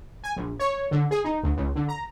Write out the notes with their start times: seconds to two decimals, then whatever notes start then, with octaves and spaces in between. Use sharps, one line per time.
0.24 G#5
0.36 A#1
0.60 C#5
0.91 D3
1.11 G#4
1.24 D#4
1.43 D2
1.57 C#2
1.75 D3
1.89 A#5